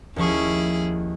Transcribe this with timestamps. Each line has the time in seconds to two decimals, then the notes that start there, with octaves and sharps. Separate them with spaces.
0.16 D#2 F3 C#4 E4 G#4 C#6